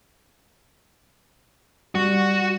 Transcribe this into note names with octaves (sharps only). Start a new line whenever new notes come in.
G3 F#4